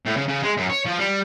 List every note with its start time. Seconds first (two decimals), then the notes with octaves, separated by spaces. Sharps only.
0.06 A2
0.17 C#3
0.29 C#3
0.44 G#3
0.58 F#2
0.70 C#5
0.86 F3
0.99 G3